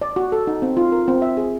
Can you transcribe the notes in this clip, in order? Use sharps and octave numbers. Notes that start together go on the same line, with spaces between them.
D5
F#4
A4
D#4
C4
F4
A#4
C4
E5
G#4